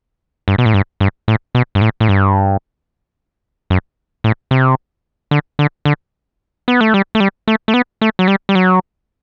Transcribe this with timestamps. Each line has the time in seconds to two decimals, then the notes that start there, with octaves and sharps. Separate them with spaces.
0.48 G2
0.58 B2
0.66 A2
0.74 G2
1.00 G2
1.28 A2
1.55 B2
1.75 G2
1.81 A2
2.00 A2
2.09 G2
3.70 F#2
4.24 A2
4.51 C3
5.31 D3
5.59 D3
5.85 D3
6.68 B3
6.81 A3
6.94 G3
7.15 A3
7.20 G3
7.48 A3
7.68 A3
7.74 B3
8.01 A3
8.19 F#3
8.28 G3
8.49 G3
8.55 F#3